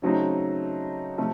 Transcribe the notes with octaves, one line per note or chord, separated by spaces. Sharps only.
C#3 F#3 A3 C4 D#4
C3 F3 A3